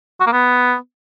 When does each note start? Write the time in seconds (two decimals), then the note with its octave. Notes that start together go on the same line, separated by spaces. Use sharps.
0.20 F#4
0.26 A#3
0.32 B3